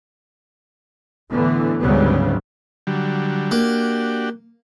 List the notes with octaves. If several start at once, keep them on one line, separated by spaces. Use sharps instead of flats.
A2 D3 E3 B3
D2 G#2 C#3 F#3 G3 B3
D3 F#3 G3
A#3 D4 F#4 G4